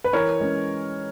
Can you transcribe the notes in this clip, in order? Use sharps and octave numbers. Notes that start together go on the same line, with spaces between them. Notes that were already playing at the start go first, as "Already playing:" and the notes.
B4
E3 A#4 C#5
G#3 C#4